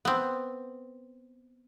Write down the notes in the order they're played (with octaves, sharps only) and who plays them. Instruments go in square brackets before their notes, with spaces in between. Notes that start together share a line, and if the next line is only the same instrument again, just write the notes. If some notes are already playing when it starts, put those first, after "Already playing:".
[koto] B3 C4